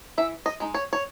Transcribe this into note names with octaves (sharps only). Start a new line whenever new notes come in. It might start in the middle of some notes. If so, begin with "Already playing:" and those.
E3 E5
D#5
G#3 D#4
C#5
C#5